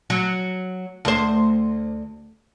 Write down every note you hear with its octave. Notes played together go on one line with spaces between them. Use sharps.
F#3
D2 C5